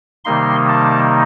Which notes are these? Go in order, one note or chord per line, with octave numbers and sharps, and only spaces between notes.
C3 D#3 G3 A#3 D#4 C6
A5